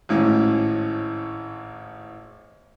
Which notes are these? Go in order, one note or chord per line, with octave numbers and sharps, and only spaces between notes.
G#1 A2 C#4